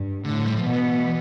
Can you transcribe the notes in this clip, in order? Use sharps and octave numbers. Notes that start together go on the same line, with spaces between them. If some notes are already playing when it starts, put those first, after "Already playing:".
Already playing: G2 G3
A2 D3 A3
G3
F3
B2 E3 B3